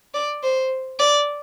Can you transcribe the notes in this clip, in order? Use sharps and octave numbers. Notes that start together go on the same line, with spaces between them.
D5
C5
D5